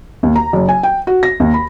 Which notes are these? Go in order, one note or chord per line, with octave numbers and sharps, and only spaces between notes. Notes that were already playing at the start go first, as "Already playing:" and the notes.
D#2
A#5
F#1
G#5
G5
F#4
A#6
D#2
B5